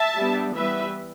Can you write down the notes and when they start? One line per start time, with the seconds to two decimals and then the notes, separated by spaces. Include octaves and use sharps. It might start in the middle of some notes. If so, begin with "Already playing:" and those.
Already playing: E5 A5
0.17 G3 B3 D4
0.55 E3 G3 B3 B4 E5